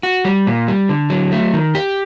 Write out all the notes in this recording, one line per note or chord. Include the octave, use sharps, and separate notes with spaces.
F#4
G3
A#2
G3
D3
F#3
A3
D#3
G4